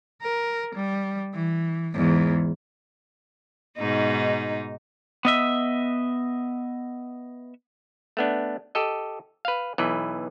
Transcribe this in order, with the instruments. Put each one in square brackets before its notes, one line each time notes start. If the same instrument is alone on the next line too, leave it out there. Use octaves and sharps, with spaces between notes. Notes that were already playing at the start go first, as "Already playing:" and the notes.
[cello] A#4
G3
E3
E2 G#2
[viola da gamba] G#2 B2 D#4
[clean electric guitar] B3 D#5 E5
[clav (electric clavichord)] A3 B3 D4
G4 A4 D#5
B4 F5
B1 E3 B4